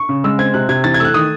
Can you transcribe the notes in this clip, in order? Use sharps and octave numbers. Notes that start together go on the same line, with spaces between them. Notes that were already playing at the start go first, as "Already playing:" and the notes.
Already playing: C#6
C#3
G#3 E6
C4 G#6
C3 F#6
C3 G#6
E3 A6
G#6
A3 E6 F#6
D#3 D#6